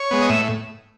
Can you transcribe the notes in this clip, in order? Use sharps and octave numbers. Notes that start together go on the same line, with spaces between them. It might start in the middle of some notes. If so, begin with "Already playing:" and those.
Already playing: C#5
G#3 B3
D#5
A2 E5